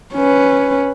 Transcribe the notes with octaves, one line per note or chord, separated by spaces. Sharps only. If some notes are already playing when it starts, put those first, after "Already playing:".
C#4 B4